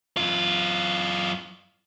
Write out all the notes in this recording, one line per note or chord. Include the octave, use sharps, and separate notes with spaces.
F#2 F4